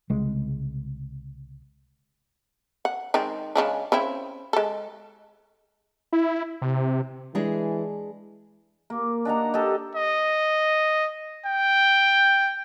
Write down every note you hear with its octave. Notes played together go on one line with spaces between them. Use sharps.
C2 C#3 G#3
F#5
D#3 G#3 C4
C#3 G#3 D4
C#3 C4 E4
G#3 A4
E4
C3
E3 G#3 D4 G#4
A#3
D4 D#4 F#5 A#5
D#4 G4 A4
D#5
G5